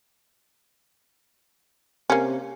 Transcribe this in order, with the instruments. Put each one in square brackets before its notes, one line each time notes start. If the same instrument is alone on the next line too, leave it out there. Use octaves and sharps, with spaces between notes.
[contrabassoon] C3 [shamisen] A#3 C#4